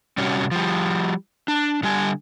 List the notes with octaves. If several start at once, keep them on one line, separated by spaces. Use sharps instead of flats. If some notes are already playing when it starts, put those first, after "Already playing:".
C3 G3 C#4 F#4 C#5
F3 G3
D4
D3 G3 G#5